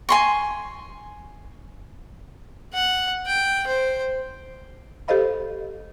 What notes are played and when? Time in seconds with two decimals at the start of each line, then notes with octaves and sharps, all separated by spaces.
0.09 G#5 C6 C#6
2.74 F#5
3.26 G5
3.67 C5
5.08 G4 A4 C5 D#5 F5 B5